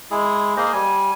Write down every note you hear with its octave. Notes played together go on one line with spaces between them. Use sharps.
G#3 E4 G#4
A#3 G#4 C5 D#5
G3 G#5